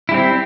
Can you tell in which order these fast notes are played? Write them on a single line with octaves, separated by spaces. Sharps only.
E4 G3 C4